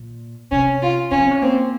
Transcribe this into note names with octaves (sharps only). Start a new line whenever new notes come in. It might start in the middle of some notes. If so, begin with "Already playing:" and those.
Already playing: A#2
C3 C#4
F4
C#3 C#4
C4
C#4
A#3 C4